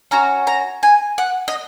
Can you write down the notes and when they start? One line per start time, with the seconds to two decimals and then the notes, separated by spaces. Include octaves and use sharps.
0.11 C#4 F#4 A#5
0.47 A#5
0.83 G#5
1.18 F#5
1.48 D#5